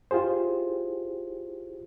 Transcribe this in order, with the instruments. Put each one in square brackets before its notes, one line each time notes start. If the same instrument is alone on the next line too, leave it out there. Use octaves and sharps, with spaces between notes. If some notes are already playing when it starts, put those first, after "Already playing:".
[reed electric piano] E4 F4 G4 G#4 C5